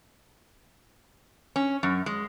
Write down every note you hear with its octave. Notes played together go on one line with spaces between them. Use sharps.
C#4
F#2
G#3